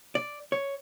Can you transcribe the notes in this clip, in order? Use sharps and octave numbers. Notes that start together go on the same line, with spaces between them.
D5
C#5